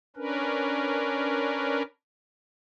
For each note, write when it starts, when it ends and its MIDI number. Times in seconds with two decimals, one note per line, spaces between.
0.16 1.82 61
0.16 1.82 62
0.16 1.82 70
0.16 1.82 71